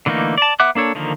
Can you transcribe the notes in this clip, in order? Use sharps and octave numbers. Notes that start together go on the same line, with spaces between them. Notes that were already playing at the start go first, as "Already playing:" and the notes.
D3 E3 A3 A#3 D#4
D5 A5
B3 E5 F#5 D6 F#6
A#3 D4 A4 C#5
D3 D#3 F3 A#3